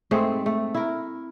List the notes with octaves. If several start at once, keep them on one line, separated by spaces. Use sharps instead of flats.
G#2 A3 C4 G#4
A3
E4 A#4